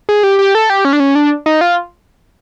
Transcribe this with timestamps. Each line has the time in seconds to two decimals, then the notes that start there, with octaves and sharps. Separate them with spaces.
0.09 G#4
0.23 G4
0.39 G4
0.55 A4
0.70 G4
0.85 C#4
0.93 D4
1.00 C#4
1.15 D4
1.46 D#4
1.61 F4